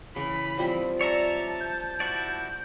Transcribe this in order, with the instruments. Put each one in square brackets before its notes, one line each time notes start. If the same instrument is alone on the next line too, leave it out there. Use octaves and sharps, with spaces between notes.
[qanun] C#3 [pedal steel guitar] E3 [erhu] B5
[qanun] F3 G3 C4
[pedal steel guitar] C#5 E5 A#5 [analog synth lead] D5 [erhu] A5
[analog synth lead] G6
[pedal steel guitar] E4 F#4 D5